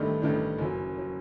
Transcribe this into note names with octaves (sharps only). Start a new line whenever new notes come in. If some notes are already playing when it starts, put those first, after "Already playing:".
Already playing: A1 G2 D#3 A3 D4
A1 G2 D#3 A3 D4
F#1 F#2 F#3
F#3